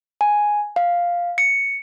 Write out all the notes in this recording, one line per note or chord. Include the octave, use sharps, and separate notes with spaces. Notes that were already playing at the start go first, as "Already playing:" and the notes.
G#5
F5
C#7